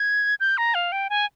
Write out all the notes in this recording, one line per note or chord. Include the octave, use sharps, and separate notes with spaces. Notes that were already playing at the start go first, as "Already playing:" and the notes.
Already playing: G#6
G6
A#5
F5
G5
G#5